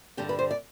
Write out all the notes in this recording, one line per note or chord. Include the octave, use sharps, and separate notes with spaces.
G2 D3 G3 G4
B4
C5
D5